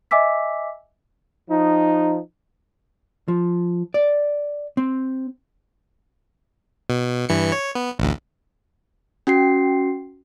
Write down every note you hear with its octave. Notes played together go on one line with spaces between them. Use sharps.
D#5 E5 G#5 D6 E6 B6
F3 D#4
F3
D5
C4
B2
G2 E3 C#7
C#5
B3
A1 D2
C#4 F#4 G5 C7